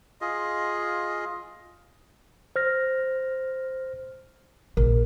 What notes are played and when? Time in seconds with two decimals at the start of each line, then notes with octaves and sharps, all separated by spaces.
0.21 F4 G#4 D#5
2.56 C5 F6 A#6
4.77 A#1 A#4